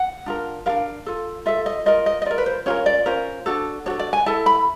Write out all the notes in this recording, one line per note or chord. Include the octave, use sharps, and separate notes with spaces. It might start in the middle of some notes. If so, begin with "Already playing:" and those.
Already playing: F#5
D4 F4 A#4
D4 F4 A#4 F5
F4 A4
F4 A4 E5
D#5
F4 A#4 D#5
D#5
D#5
F4 A#4 D5
B4
C5
C#4 F4 A#4 C#5
D5
C#4 F4 A#4 C5
D4 F#4 A4
D4 F#4 A4 C#5
D5
G#5
E4 A4 A5
B5